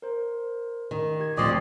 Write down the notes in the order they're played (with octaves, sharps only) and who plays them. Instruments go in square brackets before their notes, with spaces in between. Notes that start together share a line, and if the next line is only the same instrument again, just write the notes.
[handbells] A#4 C5
[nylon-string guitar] D#3
[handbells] G4 G#6
[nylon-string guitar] D2 F3 C4 [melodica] D5 D#5 [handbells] C#6 A6 C7